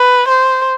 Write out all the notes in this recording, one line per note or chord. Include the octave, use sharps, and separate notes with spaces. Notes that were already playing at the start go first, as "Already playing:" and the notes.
Already playing: B4
C5